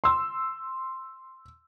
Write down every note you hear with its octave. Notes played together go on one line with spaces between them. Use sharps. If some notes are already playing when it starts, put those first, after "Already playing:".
C6 E6